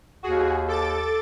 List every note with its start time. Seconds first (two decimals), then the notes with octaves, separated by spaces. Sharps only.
0.23 D#2 F#4 G#4
0.68 A4 D6 A6